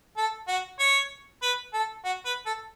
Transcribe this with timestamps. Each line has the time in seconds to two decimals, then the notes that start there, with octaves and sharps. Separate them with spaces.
0.17 A4
0.48 F#4
0.79 C#5
1.42 B4
1.73 A4
2.05 F#4
2.25 B4
2.46 A4